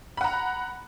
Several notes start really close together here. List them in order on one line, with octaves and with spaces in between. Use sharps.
B5 F#5 A#5